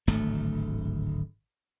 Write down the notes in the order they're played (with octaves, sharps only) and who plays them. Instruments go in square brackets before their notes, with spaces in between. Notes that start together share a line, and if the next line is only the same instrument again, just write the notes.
[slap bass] D1 G#1 D2 A3